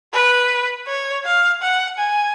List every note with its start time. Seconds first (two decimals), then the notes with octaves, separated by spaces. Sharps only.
0.13 B4
0.87 C#5
1.25 F5
1.62 F#5
1.99 G#5